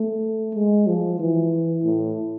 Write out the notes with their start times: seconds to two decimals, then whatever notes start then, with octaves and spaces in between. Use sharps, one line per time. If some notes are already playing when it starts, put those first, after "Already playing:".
Already playing: A3
0.54 G#3
0.87 F3
1.19 E3
1.84 A2